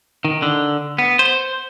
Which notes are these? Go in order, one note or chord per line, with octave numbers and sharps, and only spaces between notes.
D#3
D3
B3
C5